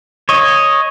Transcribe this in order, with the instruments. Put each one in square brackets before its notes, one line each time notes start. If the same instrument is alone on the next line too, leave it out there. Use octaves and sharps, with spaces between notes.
[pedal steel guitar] C#5 D#5